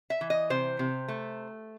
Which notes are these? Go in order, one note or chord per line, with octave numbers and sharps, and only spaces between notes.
E5
E3
D#5
C3 C5
C3
A3